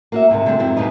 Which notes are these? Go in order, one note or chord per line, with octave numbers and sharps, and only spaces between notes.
A#3 F#4 E5
D2 G#2 C3 D#3
D3 G3 A3 B3 C4
F2 G#2 F#3 C4 E4
D#2 G#2 B2 G3 D#4